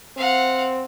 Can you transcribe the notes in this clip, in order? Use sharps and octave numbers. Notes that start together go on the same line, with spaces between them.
C4 F5 F#5